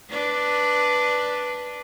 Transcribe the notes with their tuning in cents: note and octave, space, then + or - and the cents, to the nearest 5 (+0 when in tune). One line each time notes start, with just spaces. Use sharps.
D4 +0 B4 +0